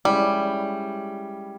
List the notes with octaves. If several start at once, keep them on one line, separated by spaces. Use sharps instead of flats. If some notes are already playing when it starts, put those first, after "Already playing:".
G3 G#3 C#4 E4